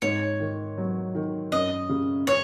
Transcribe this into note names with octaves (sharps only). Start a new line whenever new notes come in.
G#2 C#5
D#3
F#3
D#3
F#2 D#5
C#3
C#4 C#5